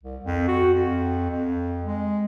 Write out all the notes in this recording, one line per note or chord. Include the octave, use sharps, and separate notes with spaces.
C2
F2
F#4
F2
F2
G#3